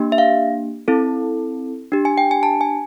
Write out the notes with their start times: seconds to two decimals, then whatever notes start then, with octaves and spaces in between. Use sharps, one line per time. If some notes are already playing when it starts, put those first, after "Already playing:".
Already playing: A#3 D4 G4
0.12 E5
0.18 F5
0.88 C4 E4 A4
1.92 D4 G4
2.05 G#5
2.18 G5
2.31 G#5
2.43 A5
2.61 G#5